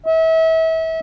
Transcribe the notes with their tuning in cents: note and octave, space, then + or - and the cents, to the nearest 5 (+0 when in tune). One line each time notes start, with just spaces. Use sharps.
E5 -35